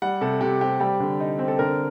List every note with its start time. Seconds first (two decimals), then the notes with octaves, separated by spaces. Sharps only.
0.02 G3 F#5
0.21 C3 A4
0.41 C3 G4
0.61 C4 G4
0.80 G3 G4
1.00 D3
1.20 D#4
1.39 C4
1.48 A4
1.59 D3 A#4